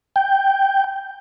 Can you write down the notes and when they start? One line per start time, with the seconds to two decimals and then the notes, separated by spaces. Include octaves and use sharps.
0.16 G5